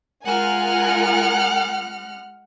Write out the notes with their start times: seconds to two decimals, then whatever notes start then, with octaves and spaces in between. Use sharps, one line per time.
0.24 G#3 F4 A#4 F#5 G#5 F6